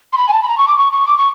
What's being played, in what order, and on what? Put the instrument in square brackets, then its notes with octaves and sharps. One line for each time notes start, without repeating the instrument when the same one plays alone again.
[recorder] C6
B5
G#5
A5
B5
A#5
C#6
D6
C#6
C#6
D6
C#6